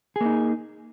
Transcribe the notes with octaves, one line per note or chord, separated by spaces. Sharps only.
A#3 D#4 G#4